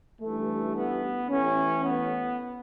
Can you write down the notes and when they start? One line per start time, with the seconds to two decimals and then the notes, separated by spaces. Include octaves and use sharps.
0.22 A1 G2 E3 A3
0.76 B3
1.30 A1 A2 E3 C#4
1.84 B3